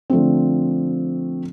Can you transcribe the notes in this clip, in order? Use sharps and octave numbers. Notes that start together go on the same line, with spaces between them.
D3 F3 A3 C4